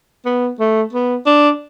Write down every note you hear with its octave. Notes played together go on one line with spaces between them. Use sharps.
B3
A3
B3
D4